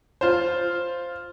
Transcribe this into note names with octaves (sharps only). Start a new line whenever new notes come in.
F4 C5